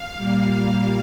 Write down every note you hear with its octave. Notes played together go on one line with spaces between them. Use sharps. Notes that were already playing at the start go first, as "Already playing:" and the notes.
Already playing: F5
A#2 G3 A#3